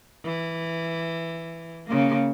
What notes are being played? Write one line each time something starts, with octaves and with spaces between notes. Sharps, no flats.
E3
C#3 A#3